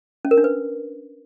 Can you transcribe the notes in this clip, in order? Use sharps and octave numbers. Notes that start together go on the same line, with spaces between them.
C#4
A#4
D4
B4